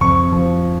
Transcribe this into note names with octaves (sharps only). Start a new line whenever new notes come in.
F2 C#6
F3